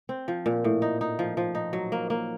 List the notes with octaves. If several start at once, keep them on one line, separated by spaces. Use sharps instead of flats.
C4
F3
A#2
A2
D#4
D#4
F3
F3
D#4
F#3
A#3
A#3